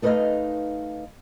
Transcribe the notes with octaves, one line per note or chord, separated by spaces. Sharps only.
A3 D#4 B4 C5 D#5 F5